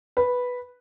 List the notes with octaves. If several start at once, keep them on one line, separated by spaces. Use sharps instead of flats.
B4